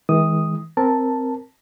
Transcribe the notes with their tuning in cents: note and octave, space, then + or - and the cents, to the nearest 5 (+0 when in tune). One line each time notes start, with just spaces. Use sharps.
E3 -45 G#3 +0 D#6 +0
C4 +0 A#4 +0 A5 +0